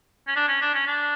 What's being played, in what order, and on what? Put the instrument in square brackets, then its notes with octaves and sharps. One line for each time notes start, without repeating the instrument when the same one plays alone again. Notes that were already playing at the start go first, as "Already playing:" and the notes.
[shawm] C#4
D4
C#4
D4
C#4
D4